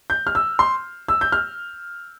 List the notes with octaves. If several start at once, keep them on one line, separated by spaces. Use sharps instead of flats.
G6
F6
E6
C6
E6
G6
F6